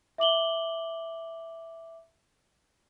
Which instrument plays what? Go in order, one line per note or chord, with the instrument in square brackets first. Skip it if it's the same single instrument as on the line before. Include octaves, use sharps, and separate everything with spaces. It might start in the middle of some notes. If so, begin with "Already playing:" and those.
[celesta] E5 D6 F#7 G7